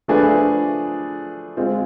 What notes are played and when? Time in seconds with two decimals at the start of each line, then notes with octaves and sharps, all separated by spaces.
0.08 F3 A3 D4 G#4 B4
1.57 G#3 C4 F4